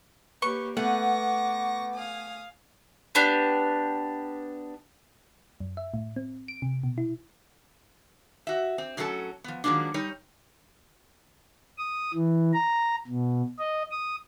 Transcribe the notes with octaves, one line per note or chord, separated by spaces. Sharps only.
A#3 G4 B4 C#5 C#6
A3 B3 F#5 C#6 D6 A#6
F5 G#5 D#6
B3 D4 G4
F#2
E5
A2
C4
D7
C3
B2
E4
F#4 E5
C4
A2 F#3 G3 C#4 A4 A5
F3 B3
D#3 F3 F#3 G#3 A#3 D4
G3 D#4 C#5
D#6
E3
A#5
B2
D#5
D#6